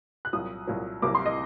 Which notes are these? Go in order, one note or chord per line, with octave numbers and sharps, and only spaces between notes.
F#6
C2 A#2 F#3 D#6
C2 A#2 F#3
C2 C3 F#3 A#3 D6
C6
D#5